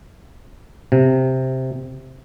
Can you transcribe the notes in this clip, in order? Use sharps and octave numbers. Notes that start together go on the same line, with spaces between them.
C3